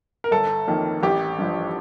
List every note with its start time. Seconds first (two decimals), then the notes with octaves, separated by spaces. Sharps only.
0.24 A#4
0.31 G1 A4
0.67 F2 D#3 A#3
1.03 A1 G4
1.38 G2 F3